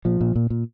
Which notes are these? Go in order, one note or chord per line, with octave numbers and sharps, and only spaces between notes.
A#2 F3
A#2
A#2
A#2